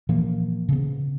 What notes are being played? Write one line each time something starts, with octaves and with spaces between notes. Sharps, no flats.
A#2 E3 F3 A#3
C#3 B3